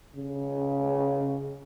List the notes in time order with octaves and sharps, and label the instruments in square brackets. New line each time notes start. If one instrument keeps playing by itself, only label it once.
[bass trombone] C#3